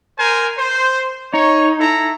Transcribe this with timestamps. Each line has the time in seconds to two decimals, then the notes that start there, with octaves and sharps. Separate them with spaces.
0.19 A#4 C5 G#5
0.58 C5
1.34 D#4 C#5
1.80 E4 A4 A#5